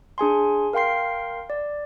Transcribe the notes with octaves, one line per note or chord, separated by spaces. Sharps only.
D4 G#4 G#5 C6
A#4 F5 G5 C6 C7
D5